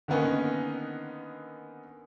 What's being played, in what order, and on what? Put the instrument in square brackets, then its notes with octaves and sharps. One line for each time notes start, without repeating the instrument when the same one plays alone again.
[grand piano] D3 D#3 A#3 B3 C#4 D#4